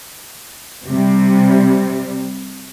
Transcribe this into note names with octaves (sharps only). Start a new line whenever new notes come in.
C3 G3